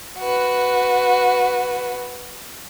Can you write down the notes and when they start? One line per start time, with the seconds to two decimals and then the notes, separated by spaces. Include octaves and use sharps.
0.19 F#4 B4